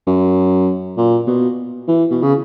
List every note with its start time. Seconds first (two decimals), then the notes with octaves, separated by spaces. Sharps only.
0.07 F#2
0.97 A#2
1.28 B2
1.88 E3
2.11 B2
2.22 C#3